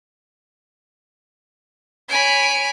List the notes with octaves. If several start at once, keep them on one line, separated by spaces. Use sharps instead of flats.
C#5 G#5 B5 D7